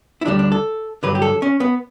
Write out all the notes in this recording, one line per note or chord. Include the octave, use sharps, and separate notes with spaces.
E4
D2 D3 G3 D4
D4
A4
G2 D3 F#3 B4
G4
A4
C#4
B3